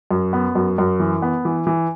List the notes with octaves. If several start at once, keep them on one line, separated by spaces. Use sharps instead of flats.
F#2
B3
F#2
F#2
E3
B3
E3
E3